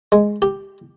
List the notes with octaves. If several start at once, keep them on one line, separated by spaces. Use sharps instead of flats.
G#3
G4